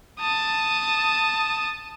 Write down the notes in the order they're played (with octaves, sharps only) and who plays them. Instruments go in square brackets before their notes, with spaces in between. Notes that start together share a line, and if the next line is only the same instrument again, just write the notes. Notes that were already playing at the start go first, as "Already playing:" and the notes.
[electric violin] A5 D#6